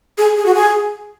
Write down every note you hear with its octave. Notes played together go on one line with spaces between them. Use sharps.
G#4
G#4
F#4
G#4